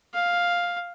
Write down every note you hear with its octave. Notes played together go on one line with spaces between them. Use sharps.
F5